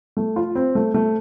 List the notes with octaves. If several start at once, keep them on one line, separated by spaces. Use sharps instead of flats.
A3
F4
C4
A3
A3